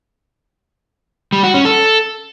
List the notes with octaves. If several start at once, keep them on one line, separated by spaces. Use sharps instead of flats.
G3
F#4
C#4
A4